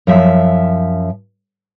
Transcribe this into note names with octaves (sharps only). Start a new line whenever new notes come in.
F#2 F3 E5